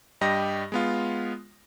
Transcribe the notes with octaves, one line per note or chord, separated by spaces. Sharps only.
G2 G3 G4 D#5 A#6
G#3 B3 F4